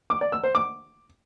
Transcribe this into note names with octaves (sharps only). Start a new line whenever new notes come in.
D6
D5
E6
C5
D6